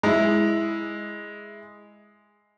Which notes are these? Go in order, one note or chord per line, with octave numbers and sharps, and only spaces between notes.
G#3 E4